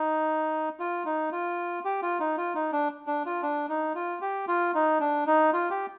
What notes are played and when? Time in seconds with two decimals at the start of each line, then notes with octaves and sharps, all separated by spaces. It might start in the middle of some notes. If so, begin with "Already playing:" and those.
Already playing: D#4
0.80 F4
1.06 D#4
1.32 F4
1.85 G4
2.02 F4
2.20 D#4
2.38 F4
2.55 D#4
2.73 D4
3.07 D4
3.26 F4
3.42 D4
3.69 D#4
3.95 F4
4.22 G4
4.48 F4
4.75 D#4
5.00 D4
5.27 D#4
5.53 F4
5.70 G4